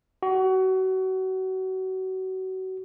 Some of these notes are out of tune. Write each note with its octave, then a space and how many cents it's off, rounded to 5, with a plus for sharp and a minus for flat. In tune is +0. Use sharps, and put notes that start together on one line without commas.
F#4 +30